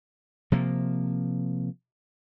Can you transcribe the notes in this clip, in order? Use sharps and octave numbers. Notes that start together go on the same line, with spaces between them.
C3 F3 A#3